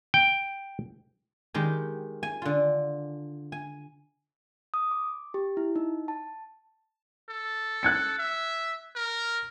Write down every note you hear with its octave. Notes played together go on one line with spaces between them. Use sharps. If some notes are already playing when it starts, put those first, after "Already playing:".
G5
D#3 G#3 G4
G#5
D3 F4
G#5
D#6
D6
G4
E4
D#4
A5
A4
F#6 G#6 C#7
E5
A#4